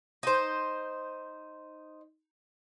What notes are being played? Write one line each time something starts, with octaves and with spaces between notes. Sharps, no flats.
D#4 C5